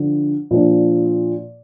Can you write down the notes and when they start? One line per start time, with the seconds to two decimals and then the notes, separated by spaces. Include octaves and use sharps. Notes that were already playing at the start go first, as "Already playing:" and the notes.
Already playing: D3 F3 D4
0.51 A#2 F3 D4